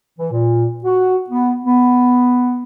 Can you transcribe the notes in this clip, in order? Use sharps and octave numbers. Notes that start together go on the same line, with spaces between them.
E3
A#2
F#4
B3
B3